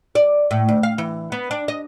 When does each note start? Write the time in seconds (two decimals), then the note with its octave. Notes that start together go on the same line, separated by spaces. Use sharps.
0.15 D5
0.51 A2
0.69 D2
0.83 F5
0.98 E3
1.32 B3
1.51 D4
1.68 D#5